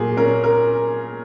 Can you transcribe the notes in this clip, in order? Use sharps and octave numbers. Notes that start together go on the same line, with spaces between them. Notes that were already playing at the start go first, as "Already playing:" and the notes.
Already playing: A#2 F#3 G#4
C#4 A#4
A#4